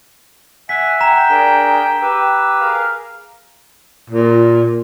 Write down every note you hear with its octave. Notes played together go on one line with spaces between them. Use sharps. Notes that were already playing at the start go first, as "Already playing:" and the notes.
E5 F#5 G#5 B6
G5 A#5 E7
D4 G#4 A#4 B6
G4 B4 E6
G#4 A#4 F5
A#2